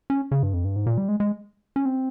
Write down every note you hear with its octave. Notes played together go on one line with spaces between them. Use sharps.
C#4
C#3
G2
F2
G2
G#2
A#2
G3
G#3
G#3
C#4
C4